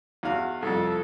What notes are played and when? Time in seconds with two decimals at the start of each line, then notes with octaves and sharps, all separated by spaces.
0.23 E2 F#4 F5
0.62 C2 F2 A4